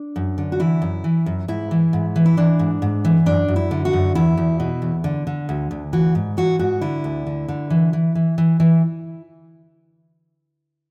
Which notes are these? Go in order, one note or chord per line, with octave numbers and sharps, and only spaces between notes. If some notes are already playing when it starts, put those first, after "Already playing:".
Already playing: D4
F#2
D3
F#4
E3 E4
F#2
E3
F#2
G#2 E4
E3
G#2
E3
E4
E3 D4
G#2
G#2
E3
F#2 D4
F#2
E4
D3
F#4
F#2
E2 E4
E2
B2
E2
D3
D3
D2
D2
E3 F#4
G#2
E3 F#4
G#2 F#4
D3 E4
D2
D3
D3
E3
E3
E3
E3
E3